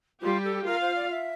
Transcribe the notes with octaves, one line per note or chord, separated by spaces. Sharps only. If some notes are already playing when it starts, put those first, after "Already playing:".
G3 F4 G4
A4
F4 A#4 F5
C5
D5
E5